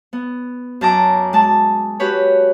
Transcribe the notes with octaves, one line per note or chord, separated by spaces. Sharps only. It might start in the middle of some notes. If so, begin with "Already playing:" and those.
B3
F#2 A5 A#5 D6
G#3 A5
F#4 G4 B4 C#5